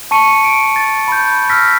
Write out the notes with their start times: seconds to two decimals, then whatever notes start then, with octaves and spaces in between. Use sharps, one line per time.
0.11 A5 C#6 C#7 D#7
0.44 D7
0.76 A6
1.08 B5 G6
1.50 E6 F6 A#6 B6